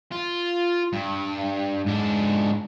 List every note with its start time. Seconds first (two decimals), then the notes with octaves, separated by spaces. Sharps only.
0.12 F4
0.93 G2
1.86 G#2 D4